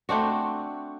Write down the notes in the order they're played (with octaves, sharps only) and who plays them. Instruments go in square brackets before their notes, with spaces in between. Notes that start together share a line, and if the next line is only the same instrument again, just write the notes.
[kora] A3 C4 D4 F#4